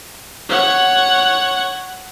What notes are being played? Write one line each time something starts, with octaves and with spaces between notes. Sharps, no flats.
C#5 F#5